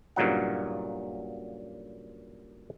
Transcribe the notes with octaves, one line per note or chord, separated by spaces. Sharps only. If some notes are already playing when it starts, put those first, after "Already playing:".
G2 A#2 C#3 F#3 D#4 F#5